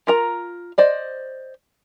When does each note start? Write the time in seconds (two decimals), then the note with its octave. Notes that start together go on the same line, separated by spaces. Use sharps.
0.07 F4 A#4 A#5
0.78 C5 D5 D#5